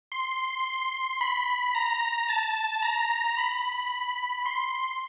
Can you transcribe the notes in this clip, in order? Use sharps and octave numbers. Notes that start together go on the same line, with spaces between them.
C6
B5
A#5
A5
A#5
B5
C6